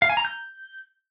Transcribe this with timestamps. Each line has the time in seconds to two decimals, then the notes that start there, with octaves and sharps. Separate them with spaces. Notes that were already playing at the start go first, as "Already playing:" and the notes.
0.02 F5
0.10 G#5
0.17 A#5
0.25 G6